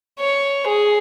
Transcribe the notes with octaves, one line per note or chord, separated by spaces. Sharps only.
C#5
G#4